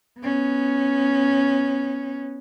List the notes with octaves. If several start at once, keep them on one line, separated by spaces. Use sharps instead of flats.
B3 C#4